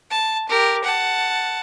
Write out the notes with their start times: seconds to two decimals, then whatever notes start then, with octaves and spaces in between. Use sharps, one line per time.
0.11 A5
0.49 G4 A#4
0.84 F#5 A5